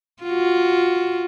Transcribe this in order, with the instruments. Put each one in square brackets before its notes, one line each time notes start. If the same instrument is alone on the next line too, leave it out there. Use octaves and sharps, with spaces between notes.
[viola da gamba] F4 F#4